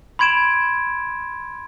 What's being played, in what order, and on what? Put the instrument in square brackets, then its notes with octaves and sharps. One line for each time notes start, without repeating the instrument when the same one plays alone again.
[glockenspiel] B5 C6 G#6 D7 E7